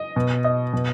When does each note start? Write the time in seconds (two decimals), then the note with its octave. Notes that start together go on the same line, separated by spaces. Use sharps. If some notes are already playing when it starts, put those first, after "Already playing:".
Already playing: D#5
0.16 B2
0.44 D#5
0.73 B2